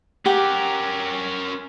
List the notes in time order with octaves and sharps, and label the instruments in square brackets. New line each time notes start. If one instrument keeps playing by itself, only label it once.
[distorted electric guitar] C#4 A#4 [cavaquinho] G4 F#5 D6